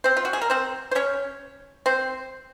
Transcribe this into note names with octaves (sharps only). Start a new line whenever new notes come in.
C4 C5
F4
F#4
G#4
A#4
C4 C5
C5
C#4 C#5
C4 C5